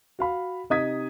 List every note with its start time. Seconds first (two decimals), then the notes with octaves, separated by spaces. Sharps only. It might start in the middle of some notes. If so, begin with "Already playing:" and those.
0.19 F#4 F5 B5
0.70 C3 D#4 D#5 D#6 G#6 B6